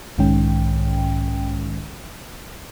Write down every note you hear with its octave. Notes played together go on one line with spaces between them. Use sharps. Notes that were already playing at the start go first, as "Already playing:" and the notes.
B1 G#2 D#3 G#3 C#4 G5